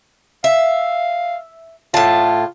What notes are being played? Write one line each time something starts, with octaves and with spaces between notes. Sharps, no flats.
E5 F5
A2 F4 A5